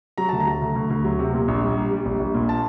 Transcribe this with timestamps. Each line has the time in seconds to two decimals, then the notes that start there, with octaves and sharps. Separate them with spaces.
0.18 F#3 A#5
0.29 D2 A5
0.40 A#5
0.46 F#3
0.61 D2
0.76 D2
0.90 D2
1.04 F#3
1.19 C3
1.34 A#2
1.48 A#1
1.63 G3
1.76 G3
1.91 G3
2.05 A#1
2.19 A#1
2.34 A#2
2.49 A5